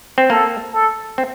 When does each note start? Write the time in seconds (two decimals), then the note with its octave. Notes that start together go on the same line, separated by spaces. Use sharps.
0.18 C4
0.30 A#3 A4
0.74 A4
1.18 C4